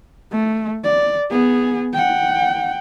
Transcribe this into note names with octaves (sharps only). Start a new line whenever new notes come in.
A3
D5
B3 G#4
F#5 G5